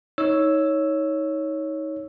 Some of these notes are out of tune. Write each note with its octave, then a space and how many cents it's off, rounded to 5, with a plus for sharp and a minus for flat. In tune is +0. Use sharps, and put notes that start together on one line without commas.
D#4 +25 C#5 +0 E6 +0